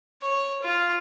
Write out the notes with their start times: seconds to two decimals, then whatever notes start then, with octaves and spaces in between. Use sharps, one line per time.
0.22 C#5
0.62 F4